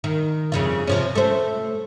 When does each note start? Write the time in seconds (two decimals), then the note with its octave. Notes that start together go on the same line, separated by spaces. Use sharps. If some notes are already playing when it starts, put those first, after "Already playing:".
0.04 D#3
0.52 F2 C#3 F4
0.87 C3 F3 C#4
1.15 A3 C5